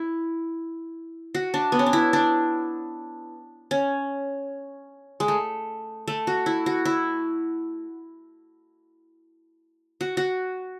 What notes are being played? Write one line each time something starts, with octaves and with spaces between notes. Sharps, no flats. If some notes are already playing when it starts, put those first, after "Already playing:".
Already playing: E4
F#4
D4
B3
C#4
D4
E4
D4
C#4
G#3
A3
A3
F#4
E4
F#4
E4
F#4
F#4